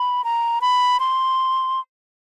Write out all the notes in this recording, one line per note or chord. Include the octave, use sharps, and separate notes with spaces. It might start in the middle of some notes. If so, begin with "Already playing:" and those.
Already playing: B5
A#5
B5
C6